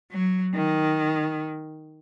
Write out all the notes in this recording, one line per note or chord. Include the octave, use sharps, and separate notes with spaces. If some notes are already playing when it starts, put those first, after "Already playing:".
F#3
D#3